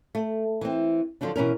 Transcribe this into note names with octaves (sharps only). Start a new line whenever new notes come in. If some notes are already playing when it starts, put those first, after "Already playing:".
A3
E3 C4
D3 F3 F#3 D4
B2 E3 C#4 A#4